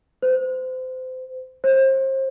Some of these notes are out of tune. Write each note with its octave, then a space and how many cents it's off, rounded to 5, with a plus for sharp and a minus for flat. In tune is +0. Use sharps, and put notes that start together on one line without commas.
C5 -30
C5 +35